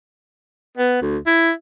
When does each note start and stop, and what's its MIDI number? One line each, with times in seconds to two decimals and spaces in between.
0.78 1.01 59
1.02 1.18 38
1.27 1.52 64